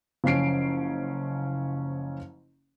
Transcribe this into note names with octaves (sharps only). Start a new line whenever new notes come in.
F#1 F3 C#4 C7 D7